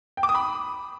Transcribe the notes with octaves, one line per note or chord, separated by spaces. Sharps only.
G5
D6
D#6
B5